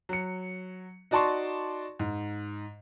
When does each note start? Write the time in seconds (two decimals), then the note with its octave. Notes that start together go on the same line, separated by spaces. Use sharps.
0.09 F#3 C#7
1.11 D#4 F#4 D5 A5 C6 C#6
2.00 G#2